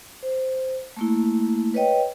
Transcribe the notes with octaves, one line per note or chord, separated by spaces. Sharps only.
C5
A3 A#3 E4
B4 C#5 D#5 G5